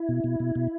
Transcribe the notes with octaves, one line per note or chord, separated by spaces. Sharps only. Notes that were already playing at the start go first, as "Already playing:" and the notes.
Already playing: E4
B2
B2
B2
B2